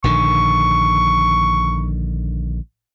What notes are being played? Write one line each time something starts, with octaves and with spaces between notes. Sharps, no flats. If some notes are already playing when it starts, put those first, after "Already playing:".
A#1 D3 D#3 C#6